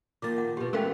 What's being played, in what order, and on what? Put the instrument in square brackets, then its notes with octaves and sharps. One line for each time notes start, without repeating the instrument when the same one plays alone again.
[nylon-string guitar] D#3 F3 A#3 [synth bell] D6 A6
[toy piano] F#5
[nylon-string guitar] B2 F3 [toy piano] G4 B4
[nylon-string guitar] E3 A3 [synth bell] G#3 C#4 G4 [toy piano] A#4 F5 G5